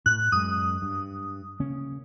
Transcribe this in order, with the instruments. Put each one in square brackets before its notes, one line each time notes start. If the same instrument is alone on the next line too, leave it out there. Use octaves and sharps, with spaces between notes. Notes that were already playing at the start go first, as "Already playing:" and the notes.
[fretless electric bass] A2 [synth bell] F#6
[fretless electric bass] F#2 G#3 [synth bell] D#6
[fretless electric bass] G2
C#3 A#3 C#4